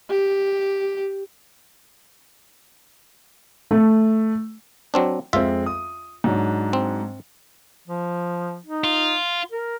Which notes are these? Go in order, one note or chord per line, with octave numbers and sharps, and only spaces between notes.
G4
A3
F#3 C4 D4
F2 G#3 C4 F4 E5
D#6
G#2 F#3 D4
C4
F3
D#4
F4
A#4